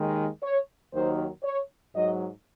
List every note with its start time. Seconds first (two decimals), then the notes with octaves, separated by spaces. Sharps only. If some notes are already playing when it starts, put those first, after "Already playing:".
Already playing: D#2 D#3 G#3
0.43 C#5
0.93 D#2 D#3 F#3 C5
1.43 C#5
1.94 G#2 F#3 D#5